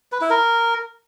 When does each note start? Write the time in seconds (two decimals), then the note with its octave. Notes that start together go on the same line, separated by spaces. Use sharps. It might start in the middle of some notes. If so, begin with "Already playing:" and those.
0.12 B4
0.21 E4
0.30 A#4